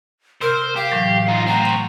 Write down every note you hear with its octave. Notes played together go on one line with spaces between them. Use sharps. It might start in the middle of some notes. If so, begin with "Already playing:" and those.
C3 A#4 C5
G4 F5
A2 E3 F#3
D#4 F4
A3 C4 F#4 A#5
C6 C#6